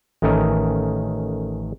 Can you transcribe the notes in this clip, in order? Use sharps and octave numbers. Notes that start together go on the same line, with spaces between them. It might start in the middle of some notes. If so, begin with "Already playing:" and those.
A1 D#3 A3 C#4 A#4 D#5